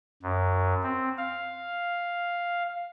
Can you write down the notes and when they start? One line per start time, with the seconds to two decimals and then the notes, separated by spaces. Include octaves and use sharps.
0.23 F#2
0.83 C4
1.18 F5